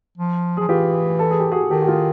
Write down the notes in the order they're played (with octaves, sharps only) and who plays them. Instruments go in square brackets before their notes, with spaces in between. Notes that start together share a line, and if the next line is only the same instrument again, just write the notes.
[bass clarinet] F3
[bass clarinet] F3 [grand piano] G#4
[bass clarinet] E3 [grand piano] F4 G4
[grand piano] A4
G#4
G4
F#4 G#4
[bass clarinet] D#3 [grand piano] G4 A4
[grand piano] F#4
F4 G4